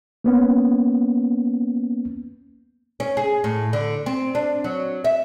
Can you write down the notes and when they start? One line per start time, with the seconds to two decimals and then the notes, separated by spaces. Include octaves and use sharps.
0.24 A#3 B3 C#4
3.00 C#4
3.17 G#4
3.44 A2
3.73 D3
4.06 C4
4.35 D4
4.64 F#3
5.04 E5